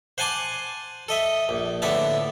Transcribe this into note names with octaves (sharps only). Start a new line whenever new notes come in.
C5 F#5 G#5 A5 C6 D6
A4 D#5 E5
A#1
A2 D3 B3 E5 A5